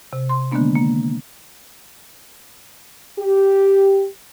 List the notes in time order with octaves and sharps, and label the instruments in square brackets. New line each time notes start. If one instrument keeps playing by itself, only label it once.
[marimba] C3
C6
D3 D#3 G#3 A#3 B3 D4
A#3
[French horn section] G4